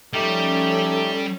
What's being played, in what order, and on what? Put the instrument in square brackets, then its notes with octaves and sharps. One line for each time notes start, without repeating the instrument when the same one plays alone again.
[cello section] F3 C#4 [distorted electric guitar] G3 [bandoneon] A3 D#4 G4 [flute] A4